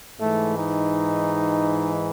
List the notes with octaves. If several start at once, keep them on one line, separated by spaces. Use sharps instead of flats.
G#2 E3 A3
D#4